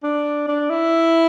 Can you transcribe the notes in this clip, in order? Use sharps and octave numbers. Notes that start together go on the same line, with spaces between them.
D4
D4
E4